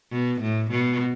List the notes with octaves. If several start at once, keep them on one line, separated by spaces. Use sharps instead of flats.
B2
A2
B2